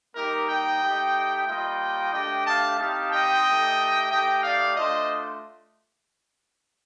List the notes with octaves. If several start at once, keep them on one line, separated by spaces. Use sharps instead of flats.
G3 A#3 D#4 G4 A#4
D#5 G5
A3 D#4 G4
G3 A#3 F4 D#5 G5
A3 D4 G4 D#5 G5
F5 A5
C4 D#4 G4 F5 A5
D#5 G5
A3 D#4 G4
A3 D#4 G4 D#5 G5
D5 F5
A3 D4 F4 C5 D#5